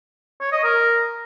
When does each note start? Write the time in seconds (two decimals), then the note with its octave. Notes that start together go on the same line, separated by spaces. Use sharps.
0.41 C#5
0.52 D#5
0.64 A#4